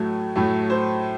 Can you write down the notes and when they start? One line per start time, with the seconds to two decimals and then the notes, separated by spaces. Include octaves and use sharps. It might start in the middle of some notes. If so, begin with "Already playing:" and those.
Already playing: A2 F#3 A3
0.36 A2 F#3 A3
0.70 C5